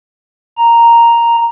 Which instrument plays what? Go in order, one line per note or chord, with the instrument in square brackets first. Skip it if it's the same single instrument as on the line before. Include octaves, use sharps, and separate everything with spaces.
[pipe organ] A#5